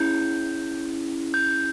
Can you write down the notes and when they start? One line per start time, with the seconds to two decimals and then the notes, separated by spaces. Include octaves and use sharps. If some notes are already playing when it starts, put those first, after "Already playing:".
Already playing: C#4 E4 G#4 G6
1.34 G6